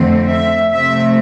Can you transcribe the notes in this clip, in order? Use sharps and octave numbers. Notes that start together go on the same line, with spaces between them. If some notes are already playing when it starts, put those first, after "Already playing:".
Already playing: F2 D3 A3 C4
E5
C3 F3 A3 C4 E5